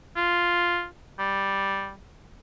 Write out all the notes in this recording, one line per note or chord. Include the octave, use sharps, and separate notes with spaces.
F4
G3